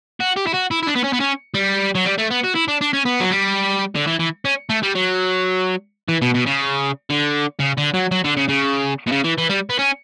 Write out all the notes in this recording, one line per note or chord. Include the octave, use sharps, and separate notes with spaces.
F#4
G4
E4
F#4
E4
E4
D4
B3
C#4
B3
C#4
G3
F#3
G3
A3
B3
F#4
E4
D4
D4
C#4
B3
F#3
G3
D3
E3
E3
C#4
A3
G3
F#3
E3
B2
B2
C#3
D3
C#3
D3
F#3
F#3
D3
C#3
C#3
B2
C#3
E3
E3
G3
B3
C#4